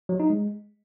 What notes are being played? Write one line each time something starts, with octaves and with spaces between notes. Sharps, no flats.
F#3
D#4
G#3